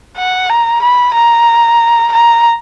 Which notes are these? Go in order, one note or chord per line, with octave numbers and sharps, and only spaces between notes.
F#5
A#5
B5
A#5
A#5